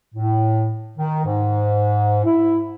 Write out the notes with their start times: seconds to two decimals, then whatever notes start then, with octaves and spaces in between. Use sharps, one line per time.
0.15 A2
0.97 D#3
1.25 G#2
2.25 E4